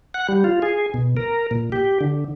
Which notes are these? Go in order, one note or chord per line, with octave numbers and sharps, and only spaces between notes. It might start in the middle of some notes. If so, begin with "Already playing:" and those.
F#5
G3
F4
G#4
B2
A#4
A#2
G4
D3